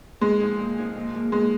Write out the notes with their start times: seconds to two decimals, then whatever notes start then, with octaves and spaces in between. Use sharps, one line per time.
0.21 A#2 G#3
0.39 F3 C4 D#4 G#4
0.59 A#2
0.76 F3 C4 D#4 G#4
0.96 A#2
1.14 F3 A#3
1.32 A#2 G#3